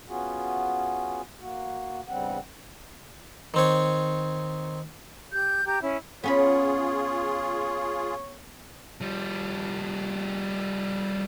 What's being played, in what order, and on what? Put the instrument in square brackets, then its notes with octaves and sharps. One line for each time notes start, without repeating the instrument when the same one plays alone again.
[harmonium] B3 C#4 F4 F#4 G#4
A#3 F#4
E2 G2 C#3 G3 C4 F#5
[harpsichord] D#3 C4 C#5
[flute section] G4 G6
G4 A#5 G6
C#4 E4
[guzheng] B3 C#4 B5 [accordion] F4 G#4 [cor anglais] C#5
[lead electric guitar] F3 G3